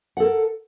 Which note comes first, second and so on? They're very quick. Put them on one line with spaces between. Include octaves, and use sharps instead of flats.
F#5 A4 A#4